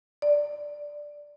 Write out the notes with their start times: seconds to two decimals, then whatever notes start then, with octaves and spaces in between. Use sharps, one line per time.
0.22 D5